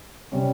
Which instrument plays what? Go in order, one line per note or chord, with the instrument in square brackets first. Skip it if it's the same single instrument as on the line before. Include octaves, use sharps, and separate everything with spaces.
[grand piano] C3 G3 C#4